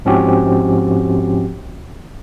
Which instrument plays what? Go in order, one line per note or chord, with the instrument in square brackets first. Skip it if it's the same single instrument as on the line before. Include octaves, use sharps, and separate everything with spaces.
[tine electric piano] G#2 F3 C4 C#4 F#4 G4